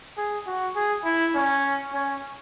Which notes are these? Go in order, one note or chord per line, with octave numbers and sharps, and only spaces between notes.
G#4
F#4
G#4
E4
C#4
C#4